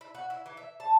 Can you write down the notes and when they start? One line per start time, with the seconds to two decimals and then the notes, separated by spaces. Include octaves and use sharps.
0.01 E4
0.15 F#4
0.30 E4
0.46 E3
0.57 E5
0.80 A5